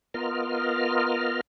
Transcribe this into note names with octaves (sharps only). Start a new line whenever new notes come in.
B3 F4 A#4 D#5 F6